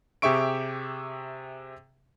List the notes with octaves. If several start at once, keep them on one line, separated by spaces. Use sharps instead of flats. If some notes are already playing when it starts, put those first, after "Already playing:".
C3 G4 G#4 E5 C#6 D7